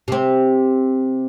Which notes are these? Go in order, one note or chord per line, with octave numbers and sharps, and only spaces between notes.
C3 C4